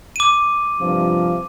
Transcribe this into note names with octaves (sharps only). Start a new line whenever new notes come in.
D6 D#7
G2 C3 F3